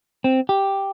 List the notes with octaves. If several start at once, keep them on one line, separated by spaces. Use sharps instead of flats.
C4
G4